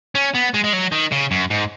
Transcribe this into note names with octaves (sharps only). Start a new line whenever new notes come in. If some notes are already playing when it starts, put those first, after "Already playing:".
C#4
B3
G#3
G#3
F#3
D#3
C#3
F#2
G#2